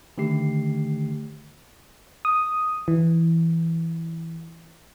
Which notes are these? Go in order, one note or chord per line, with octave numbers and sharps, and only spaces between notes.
D3 D#3 A3 G4 C7
D#6
E3